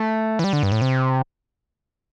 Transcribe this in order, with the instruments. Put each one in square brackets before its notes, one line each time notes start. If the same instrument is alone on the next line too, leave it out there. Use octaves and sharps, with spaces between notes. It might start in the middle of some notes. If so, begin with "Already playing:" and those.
Already playing: [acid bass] A3
E3
G3
D3
G2
A2
C3